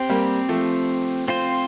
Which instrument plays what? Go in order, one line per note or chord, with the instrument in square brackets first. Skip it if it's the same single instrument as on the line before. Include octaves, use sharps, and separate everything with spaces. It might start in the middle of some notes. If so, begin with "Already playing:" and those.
Already playing: [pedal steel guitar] C4 G4 C5
[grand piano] G3 A#3
F3 A3
[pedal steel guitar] C4 F4 C5